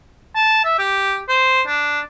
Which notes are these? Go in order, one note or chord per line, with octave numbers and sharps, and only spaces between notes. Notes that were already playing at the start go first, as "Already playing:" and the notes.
A5
E5
G4
C5
D4